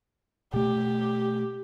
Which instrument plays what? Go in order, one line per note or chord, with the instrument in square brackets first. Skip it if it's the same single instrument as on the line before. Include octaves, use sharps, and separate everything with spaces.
[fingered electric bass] B2 A3 [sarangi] G4